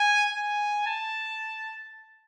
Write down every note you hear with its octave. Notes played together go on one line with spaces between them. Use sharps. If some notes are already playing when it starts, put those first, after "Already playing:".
Already playing: G#5
G#5
A5